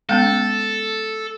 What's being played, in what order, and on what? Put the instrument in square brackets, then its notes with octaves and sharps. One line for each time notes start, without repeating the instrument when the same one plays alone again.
[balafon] G#3 B3 C#4 [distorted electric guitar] A4